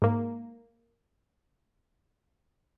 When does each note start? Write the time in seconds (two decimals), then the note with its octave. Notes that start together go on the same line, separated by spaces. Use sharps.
0.02 G#2 A#3